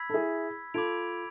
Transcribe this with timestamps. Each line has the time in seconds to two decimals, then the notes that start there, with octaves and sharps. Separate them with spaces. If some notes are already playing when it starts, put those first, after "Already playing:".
Already playing: B5 E6 G#6 B6
0.10 A4
0.14 E4 G#4
0.74 F4 A4 B5 D6 G#6 D7 F7